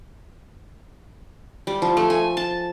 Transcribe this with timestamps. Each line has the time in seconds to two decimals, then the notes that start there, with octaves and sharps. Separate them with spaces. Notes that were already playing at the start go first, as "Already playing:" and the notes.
1.67 G3
1.82 F3
1.97 A3
2.10 G#5
2.37 A5